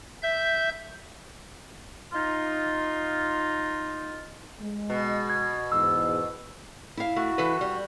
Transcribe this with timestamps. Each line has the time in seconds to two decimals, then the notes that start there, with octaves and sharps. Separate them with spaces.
0.23 E5 G6
2.13 D#4 F4
4.60 G#3
4.90 B2
5.30 G#6
5.72 E2 G#2 E6
6.97 E4 F5
7.16 A3 F#4
7.38 E3 A4 B4
7.61 G3